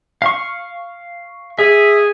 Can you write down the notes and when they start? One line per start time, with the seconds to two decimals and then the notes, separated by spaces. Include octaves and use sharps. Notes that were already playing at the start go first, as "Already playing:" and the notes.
0.22 F5 C#6
1.59 G#4 E5